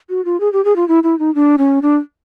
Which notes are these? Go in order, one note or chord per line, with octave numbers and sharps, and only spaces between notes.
F#4
F4
G#4
G4
G#4
F4
E4
E4
D#4
D4
C#4
D4